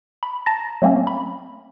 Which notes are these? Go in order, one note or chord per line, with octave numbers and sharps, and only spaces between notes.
B5
A5 A#5 A6 A#6
F#3 A3 A#3 C4 C#4
B5